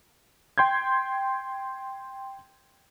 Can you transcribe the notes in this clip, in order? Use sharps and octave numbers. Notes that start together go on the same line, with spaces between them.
G5 C6 G6 G#6